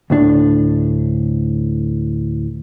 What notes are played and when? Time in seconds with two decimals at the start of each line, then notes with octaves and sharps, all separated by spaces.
0.10 D2 A2 D4